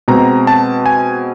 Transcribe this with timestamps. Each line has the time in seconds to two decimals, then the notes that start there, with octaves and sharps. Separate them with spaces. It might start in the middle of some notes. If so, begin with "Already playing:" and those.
0.08 B2 G#3 C4 A#5
0.47 A5
0.86 G#5